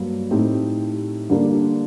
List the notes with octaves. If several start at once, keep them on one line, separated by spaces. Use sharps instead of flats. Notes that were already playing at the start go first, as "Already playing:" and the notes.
Already playing: G2 F#3 A#3
A2 A3 C4 D#4 G4
D3 G3 A#3 D4